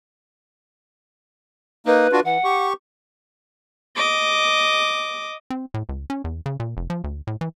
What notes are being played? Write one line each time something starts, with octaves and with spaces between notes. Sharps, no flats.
A#3 D#4 B4
D4 F4 F#4
E3 F#5
G4 C#6
D#5 D6
C4
A2
C#2
C#4
E2
C#3
A#2
F1
F3
D2
A2
E3